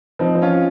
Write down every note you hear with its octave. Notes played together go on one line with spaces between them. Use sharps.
F3 C4 D#4
F3
C#4 F4